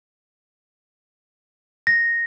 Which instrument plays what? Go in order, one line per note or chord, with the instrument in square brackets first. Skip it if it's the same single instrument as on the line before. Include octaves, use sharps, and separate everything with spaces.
[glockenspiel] A#6